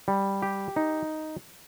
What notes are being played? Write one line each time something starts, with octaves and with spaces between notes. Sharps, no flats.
G3
G4
D#4